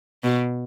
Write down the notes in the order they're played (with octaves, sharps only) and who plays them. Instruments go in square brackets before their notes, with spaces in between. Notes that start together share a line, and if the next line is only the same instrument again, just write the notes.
[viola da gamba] B2